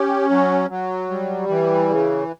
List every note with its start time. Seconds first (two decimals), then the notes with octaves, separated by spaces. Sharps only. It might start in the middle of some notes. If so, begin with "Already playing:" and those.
Already playing: C#4 G4
0.30 F#3
0.70 F#3
1.09 G3
1.49 E3
1.89 C#3